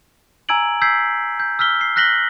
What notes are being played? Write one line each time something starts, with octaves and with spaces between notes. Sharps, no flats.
G#5 A#5 E6 G#6 D7 F#7
E6 G6 G#6 B6 C7
G6
E6 F6 B6 G7
C7
F6 F#6 A#6 B6 F#7 G7